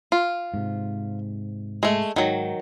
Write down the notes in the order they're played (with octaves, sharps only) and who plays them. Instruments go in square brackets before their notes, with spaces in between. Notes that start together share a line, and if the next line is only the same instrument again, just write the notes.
[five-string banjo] F4
[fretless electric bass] G#2 C3
[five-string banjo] G#3 A3
[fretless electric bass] G#2 [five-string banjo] D#3 F#3